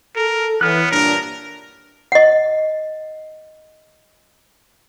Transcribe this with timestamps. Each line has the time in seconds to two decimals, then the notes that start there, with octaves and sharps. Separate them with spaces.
0.16 A4 A#4
0.61 E3 B3 C#5 F6 F#6
0.91 G2 A#2 D4 A#4
2.12 D#5 F#5